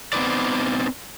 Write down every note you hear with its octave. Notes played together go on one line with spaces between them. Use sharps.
B3 C4 D#4 B4 D5